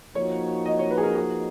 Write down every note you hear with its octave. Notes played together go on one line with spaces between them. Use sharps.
F3 A#3 D#4 F#4 C#5
D#5
C#5
B4
G#4
A#4
G#4